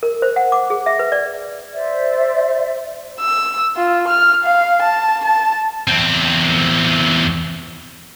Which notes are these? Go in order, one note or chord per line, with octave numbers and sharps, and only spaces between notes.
A#4
C5
F#5
D6
G#4
E5
B4
D5
C5 D5 E5
E6
F4
F6
F5
A5
A5
E2 C4